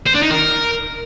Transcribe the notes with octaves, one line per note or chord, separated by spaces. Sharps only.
C5
D4
D#4
A#4